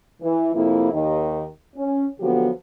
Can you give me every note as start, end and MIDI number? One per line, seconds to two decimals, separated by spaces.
0.22 0.50 52
0.54 0.89 41
0.54 0.89 48
0.54 0.89 58
0.54 0.89 64
0.93 1.47 39
0.93 1.47 51
1.76 2.06 61
2.21 2.49 50
2.21 2.49 53
2.21 2.49 54
2.21 2.49 59
2.21 2.49 66
2.21 2.49 67